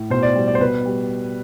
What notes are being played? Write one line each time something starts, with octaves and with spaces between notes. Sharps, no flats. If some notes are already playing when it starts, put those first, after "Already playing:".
Already playing: A2
B2 C5
D5
G3
D5
C5
B2 B4
G3